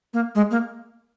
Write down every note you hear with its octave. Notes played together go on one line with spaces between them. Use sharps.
A#3
G#3
A#3